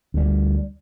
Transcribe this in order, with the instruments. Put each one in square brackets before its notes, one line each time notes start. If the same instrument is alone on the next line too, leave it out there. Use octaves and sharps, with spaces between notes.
[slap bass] D2 G3